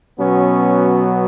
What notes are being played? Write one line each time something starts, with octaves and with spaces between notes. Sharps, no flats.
B2 F#3 B3 C#4